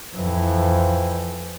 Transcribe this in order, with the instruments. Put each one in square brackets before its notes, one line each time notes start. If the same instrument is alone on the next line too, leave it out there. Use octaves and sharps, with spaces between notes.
[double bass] F2 E3